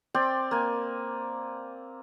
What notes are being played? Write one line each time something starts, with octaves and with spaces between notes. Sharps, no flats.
C4 D5 G5 C6
A#3 G#5